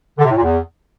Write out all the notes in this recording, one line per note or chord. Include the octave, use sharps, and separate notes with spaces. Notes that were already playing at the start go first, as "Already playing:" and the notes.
D3
C3
A2
A#2
E2